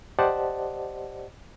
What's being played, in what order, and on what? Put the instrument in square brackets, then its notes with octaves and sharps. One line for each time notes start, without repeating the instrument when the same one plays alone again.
[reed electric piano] G4 C5 D5 D#5 F#5 A5